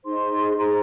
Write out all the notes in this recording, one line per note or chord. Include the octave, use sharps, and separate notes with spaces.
D#4 G#4 C5 C6
D#4 G#4 C5 A#5